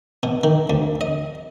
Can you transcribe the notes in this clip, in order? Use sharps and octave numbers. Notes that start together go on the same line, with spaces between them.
B2
D#3
D2
D#5